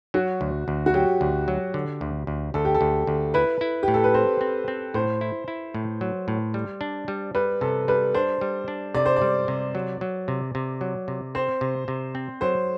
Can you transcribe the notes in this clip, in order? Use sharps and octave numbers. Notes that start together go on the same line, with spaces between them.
F#3 F#4
D2
D2
F#4
F#3 G4
D2
F#3
D3
D2
D2
D2 A4
G4
A4
D2
D2
E4 B4
E4
G4
A2
A4
B4
C4 C5
C4
C4
A2 C5
E4
E4
A2
F#3
A2
G3
D4
G3
G3 B4
C3 A4
G3 B4
D4 C5
G3
D4
C3 D5
C5
D5
G3
C3
F#3
F#3
C3
C3
F#3
C3
C4 C5
C3
C3
C4
F#3 C5